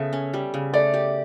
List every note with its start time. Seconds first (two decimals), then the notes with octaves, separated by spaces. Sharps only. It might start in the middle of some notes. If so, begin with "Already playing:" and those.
Already playing: C#3 B3 A4 E5
0.13 C#4
0.34 G3
0.54 C#3
0.74 A3 D5
0.94 G4